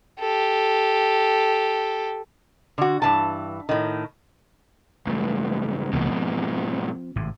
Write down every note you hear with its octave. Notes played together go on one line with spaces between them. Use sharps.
G4 A4
D3 F#4
G2 E3 A5
A2 D#3
C#2 G2 A3
C2 G#2 B2 E3 A#3
F3 C4
G#1 A2 C3